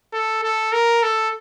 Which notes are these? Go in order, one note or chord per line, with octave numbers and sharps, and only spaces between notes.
A4
A4
A#4
A4